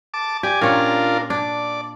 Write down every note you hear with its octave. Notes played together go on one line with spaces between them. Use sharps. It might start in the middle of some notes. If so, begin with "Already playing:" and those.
A5 D6
G4 D5 G#5
A#2 C#4 D4 F4 A#4
D4 D5